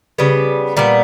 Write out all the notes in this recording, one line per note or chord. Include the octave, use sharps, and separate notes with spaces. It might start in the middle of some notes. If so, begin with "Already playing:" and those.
C#3 G3 B3
A#2 G3 B3